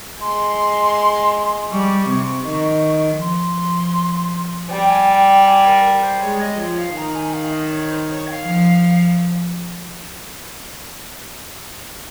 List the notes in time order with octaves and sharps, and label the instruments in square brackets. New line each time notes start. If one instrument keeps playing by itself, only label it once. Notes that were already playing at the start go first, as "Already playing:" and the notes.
[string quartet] G#3 [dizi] C6
[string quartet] G3 [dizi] C#6
[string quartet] C3
D#3
[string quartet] F3 [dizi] C6
[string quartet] G3 [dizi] G5
[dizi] G#5
G5
G5
G#5
A#4
A#4
C5
[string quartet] G#3 [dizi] C#5
[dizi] D#5
[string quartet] F3 [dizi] C#5
[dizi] F5
[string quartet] D#3 [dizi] A#5
[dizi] G#5
F5
D#5
C#5
C5
C#5
G5
F5
[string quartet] F3